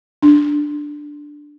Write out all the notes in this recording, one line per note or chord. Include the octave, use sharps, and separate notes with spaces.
D4